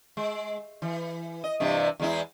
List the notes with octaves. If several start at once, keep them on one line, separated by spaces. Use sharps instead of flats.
G#3
E3
D#5
G2 C3 E3
E2 G#3 E4